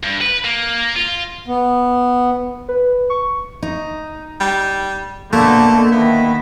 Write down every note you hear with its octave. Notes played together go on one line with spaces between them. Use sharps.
G2
B4
A#3
F4
B3
B4
C#6
D#4
G3
B2 D3 A3 A#3
D#3 B3 E4